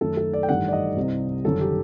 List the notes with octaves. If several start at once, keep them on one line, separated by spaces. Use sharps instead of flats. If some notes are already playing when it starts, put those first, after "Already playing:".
F#2 D#3 A3 A4
A4
D5
G5
A1 G2 D#3 G3 F#5
D5
D#5
C2 C3 G3 C4
G1 F#2 D#3 A4
G4